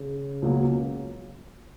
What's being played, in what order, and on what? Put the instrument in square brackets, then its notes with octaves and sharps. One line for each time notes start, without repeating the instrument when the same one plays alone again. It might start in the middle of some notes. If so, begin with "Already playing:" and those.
Already playing: [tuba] C#3
[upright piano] C#2 B2 F#3 A#3